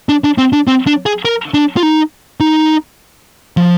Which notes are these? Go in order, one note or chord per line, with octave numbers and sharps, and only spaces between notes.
D4
D4
C4
D4
C4
D4
G#4
A#4
D4
F4
D#4
D#4
F3